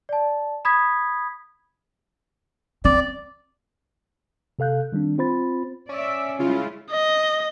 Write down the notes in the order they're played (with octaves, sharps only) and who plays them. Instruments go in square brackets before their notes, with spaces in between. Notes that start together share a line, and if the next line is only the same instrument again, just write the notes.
[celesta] D5 A5
B5 D#6 G#6 B6
[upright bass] C4 [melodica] D5
[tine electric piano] C3 A4 F5 F#6 G6
D#3 G3 C4 D4
C4 F4 C5 B5 A6
[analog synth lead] C#4 [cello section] D5 E5
[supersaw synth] C#3 F4 [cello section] G3 G#3 E4
[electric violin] D#5